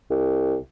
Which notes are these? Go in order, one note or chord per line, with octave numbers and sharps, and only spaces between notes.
C2